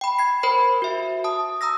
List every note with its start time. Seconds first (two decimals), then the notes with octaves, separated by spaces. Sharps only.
0.01 G5 B5
0.19 G#6 C7
0.43 A#4 C5 B5
0.82 F#4 E5
1.24 A5 D#6
1.61 A#5 D#6 E6 A#6